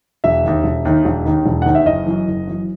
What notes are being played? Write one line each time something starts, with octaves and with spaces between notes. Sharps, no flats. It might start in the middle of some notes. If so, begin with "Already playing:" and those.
E1 E5
D#2 D#3
E1
D#2 D#3
E1
D#2 D#3
E1
D#2 D#3 F#5
E5
F#1 D#5
F#2 E3
F#1
F#2 E3